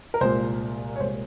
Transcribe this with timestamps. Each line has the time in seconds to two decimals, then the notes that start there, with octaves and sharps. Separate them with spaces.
0.14 A#4
0.21 C2 A#2 G#3 C5
0.96 C#5
1.00 C2 A#2 G#3 C5